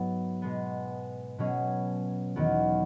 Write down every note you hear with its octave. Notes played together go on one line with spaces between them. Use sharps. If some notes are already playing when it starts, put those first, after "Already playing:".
Already playing: G#2 F#3 B3
B2 G#3 B3
B2 F#3 C#4 G#4
E2 D#3 F#3 B3